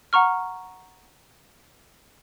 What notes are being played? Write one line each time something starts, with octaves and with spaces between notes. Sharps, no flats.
F#5 A#5 C#6 F6